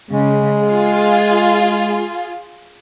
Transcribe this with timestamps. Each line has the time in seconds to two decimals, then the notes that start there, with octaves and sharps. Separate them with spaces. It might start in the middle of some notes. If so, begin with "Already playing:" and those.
0.11 C#3 G#3
0.62 F4 G#4